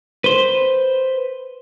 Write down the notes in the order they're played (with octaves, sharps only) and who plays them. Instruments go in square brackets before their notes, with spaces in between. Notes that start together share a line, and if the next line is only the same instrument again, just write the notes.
[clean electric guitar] B4 C5